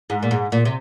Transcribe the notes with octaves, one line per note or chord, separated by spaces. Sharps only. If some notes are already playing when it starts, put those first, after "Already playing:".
G#2
A#2
G#2
A#2
C3